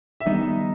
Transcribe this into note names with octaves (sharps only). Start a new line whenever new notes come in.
E5
D#3 G3 B3 D#4 D#5